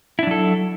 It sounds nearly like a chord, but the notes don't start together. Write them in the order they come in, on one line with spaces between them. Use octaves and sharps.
E4 D4 F#3 A4